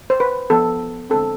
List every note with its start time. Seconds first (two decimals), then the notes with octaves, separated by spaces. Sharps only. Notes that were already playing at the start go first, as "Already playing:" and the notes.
0.10 C5
0.20 B4
0.50 F3 B3 A4
1.10 D3 G#3 C4 A4